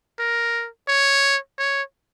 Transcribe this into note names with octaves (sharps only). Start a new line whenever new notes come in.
A#4
C#5
C#5